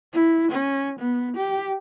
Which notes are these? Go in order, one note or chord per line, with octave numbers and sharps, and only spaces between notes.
E4
C#4
B3
G4